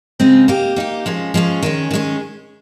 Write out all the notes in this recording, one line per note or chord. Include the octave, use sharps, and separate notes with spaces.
C#3 G#3 C4 D#4 G#4
A#3 D#4 G4
A#3 D#4 G4
F3 G#3 C#4
F3 G#3 C#4
D#3 G#3 C#4
D#3 G#3 C#4